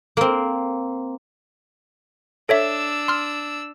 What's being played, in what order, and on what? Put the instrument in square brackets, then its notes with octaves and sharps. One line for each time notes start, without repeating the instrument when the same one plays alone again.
[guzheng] A#3 C4
[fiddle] D4 E6 [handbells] A4 C#5 E5
[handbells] C6 F6